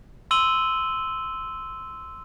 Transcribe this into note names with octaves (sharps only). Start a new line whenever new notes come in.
C6 E6 D#7 F#7 G7